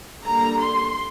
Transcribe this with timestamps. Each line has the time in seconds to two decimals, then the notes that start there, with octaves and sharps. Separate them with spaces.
0.24 D3 G3 A#3 A#5
0.59 C6